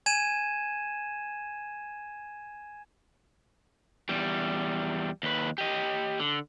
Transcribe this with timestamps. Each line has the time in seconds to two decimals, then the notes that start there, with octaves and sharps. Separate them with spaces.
0.06 G#5 G#6 D#7 E7
4.09 E2 G3
5.23 D#2 B4
5.58 G4 D#5
6.20 D3